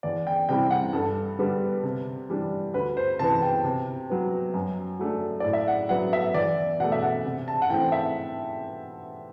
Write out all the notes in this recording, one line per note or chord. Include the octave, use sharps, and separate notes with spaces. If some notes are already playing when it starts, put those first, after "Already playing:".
E2 D5
G5
C3 G3 C4 E4 G5
F#5
G2 A4
D3 G3 B3
C3
E3 G3 D4
D2 B4
C5
C3 E3 B3 A5
G5
C3
F#3 B3
F#2
F#3 A3 D4
A2 D5
E5
F#5
F#3 B3 F#5
E5
E2 D5
B2 A3 F#5
E5
F#5
C3
A5
F#5
E3 A3 C4 G5
E5